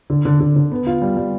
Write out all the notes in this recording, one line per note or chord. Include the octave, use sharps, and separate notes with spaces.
D3
D3
D3
D3
B3
F4
G3
G3